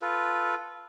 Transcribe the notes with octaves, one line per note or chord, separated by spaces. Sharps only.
F4 A4 B4